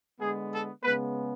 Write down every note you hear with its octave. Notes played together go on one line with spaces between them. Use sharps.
D3 G#3 B3 G#4
A4
C#3 G#3 B3 B4